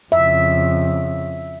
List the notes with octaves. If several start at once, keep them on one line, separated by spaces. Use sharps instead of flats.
F2 C#3 E5